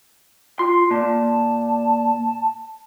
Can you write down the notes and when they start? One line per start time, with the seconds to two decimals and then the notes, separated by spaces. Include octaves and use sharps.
0.59 F4 C6
0.91 A#2 A5